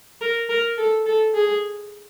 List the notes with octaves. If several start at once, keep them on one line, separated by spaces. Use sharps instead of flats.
A#4
A#4
A4
A4
G#4